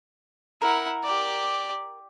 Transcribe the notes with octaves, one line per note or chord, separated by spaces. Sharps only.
E4 A#4 F#5
G4 D5